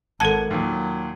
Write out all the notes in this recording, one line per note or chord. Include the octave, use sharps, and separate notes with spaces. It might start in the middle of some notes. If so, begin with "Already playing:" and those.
G#1 A4 F#5 A5 G#6 D#7
D#2 A#2 F#3